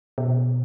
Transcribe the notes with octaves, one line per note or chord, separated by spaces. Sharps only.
B2